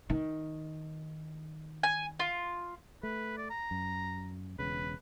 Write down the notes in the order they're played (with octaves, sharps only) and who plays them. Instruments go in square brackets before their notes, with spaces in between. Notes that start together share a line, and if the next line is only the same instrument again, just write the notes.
[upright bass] D#3
[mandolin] G#5
F4
[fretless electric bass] A3 [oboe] B4
[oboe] D5
A#5
[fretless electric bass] F#2
[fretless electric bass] E1 C#3 [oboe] B4